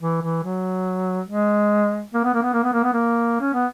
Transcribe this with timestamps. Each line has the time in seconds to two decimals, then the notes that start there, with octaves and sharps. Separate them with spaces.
0.01 E3
0.22 E3
0.44 F#3
1.28 G#3
2.14 A#3
2.24 B3
2.34 A#3
2.43 B3
2.53 A#3
2.64 B3
2.73 A#3
2.84 B3
2.93 A#3
3.40 C#4
3.54 B3